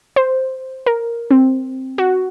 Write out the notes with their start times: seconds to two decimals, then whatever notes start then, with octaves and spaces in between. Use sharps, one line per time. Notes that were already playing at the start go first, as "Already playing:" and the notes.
0.16 C5
0.86 A#4
1.31 C4
1.98 F#4